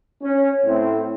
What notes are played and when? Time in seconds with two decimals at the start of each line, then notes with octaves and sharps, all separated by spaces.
0.22 C#4
0.65 A2 C4